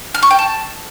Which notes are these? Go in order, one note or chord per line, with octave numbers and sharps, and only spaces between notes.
F6
C#6
G5
A5